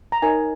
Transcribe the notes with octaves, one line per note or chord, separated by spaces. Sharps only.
A#5
D#4 A#4 C#5 G#5